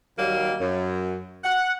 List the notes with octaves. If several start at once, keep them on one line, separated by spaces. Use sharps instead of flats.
D#2 D#3 F#3 G3 A#3
F#2
F#5